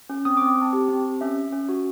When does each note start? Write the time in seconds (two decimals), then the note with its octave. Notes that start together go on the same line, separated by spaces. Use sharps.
0.10 C#4
0.25 C4 D#6
0.37 D6
0.42 C4
0.49 D6
0.57 C4 A5
0.73 G4
0.89 C4
1.04 G4
1.21 C#4 E5
1.37 C#4
1.53 C#4
1.69 F#4